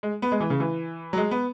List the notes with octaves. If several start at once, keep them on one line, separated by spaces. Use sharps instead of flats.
G#3
B3
G#3
E3
C#3
E3
F#3
G#3
B3